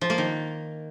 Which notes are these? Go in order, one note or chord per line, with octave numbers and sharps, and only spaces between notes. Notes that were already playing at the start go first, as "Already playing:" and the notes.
F3
A#3
D#3